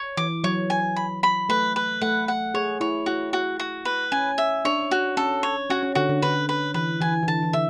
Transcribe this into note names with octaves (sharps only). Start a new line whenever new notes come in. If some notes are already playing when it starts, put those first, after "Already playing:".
Already playing: C#5
E3 D6
F#3 C#5
G#5
B5
B5
A3 B4
B4
A3 F#5
F#5
G#4 C#5
E4 C#5
E4 F#4
F#4
F#4
B4
C#4 G#5
E5
D4 C#5
F#4
C#4 A4
C#5
C#4 F#4
C#4
D3 F#4
D3
D3 B4
B4
E3 B4
E3 G#5
E3
D3 A5
E3
D3 E5